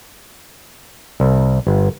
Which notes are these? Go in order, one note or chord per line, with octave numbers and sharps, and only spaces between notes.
C2
G1